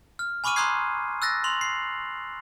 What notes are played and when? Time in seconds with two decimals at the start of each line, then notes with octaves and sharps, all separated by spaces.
0.19 F6
0.44 G#5 B5 C#6 D6 F6 D#7
0.56 A#5 C6 D#6 F#6 G#6 C7
1.22 E6 F#6 A6 A#6
1.44 C6 F7 F#7
1.61 C7